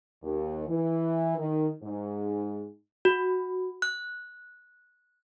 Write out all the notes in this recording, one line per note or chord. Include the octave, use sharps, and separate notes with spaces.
D#2
E3
D#3
G#2
F#4
F#6